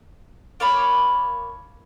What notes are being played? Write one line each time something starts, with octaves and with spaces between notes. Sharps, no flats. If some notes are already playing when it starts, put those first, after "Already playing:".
A#3 C#5 A5 B5